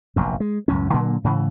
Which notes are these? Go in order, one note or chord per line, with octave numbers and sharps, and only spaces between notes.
F1 A#1 F#2
G#3
C#2 F#2 A2 C#4
A#2 D3 F#3 A#3
G#2 C#3 E3